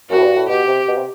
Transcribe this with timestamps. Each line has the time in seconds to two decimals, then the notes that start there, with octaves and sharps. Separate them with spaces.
0.10 F#2 F#4
0.17 A2
0.24 G2
0.36 A2
0.49 B2 G4
0.68 C3
0.88 B2
0.97 C3